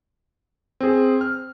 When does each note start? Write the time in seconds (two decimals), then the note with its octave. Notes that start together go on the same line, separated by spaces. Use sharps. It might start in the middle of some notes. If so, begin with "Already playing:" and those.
0.80 C4 G#4
1.21 F6